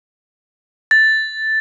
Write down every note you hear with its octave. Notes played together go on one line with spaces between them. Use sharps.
A6